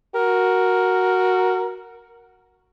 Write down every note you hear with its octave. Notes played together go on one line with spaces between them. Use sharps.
F#4 A#4